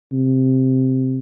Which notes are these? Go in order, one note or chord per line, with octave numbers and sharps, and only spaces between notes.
C3